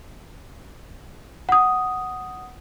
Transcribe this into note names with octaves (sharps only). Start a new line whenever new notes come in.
F#5 D#6